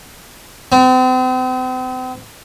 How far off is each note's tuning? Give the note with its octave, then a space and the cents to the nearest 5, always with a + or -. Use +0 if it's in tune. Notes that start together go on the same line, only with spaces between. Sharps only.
C4 -40